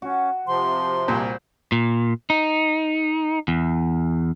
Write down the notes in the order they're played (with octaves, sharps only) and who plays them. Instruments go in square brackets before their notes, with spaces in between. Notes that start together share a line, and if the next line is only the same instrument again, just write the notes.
[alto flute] C#4 [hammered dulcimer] F#4
[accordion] C3 F3 [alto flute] C6
[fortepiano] C2 A#2 [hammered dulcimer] C5
[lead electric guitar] A#2
D#4
E2